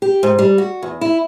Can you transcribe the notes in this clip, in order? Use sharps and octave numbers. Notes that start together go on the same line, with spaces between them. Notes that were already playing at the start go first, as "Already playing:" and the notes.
G4
G#2
G3
F#4
E2
E4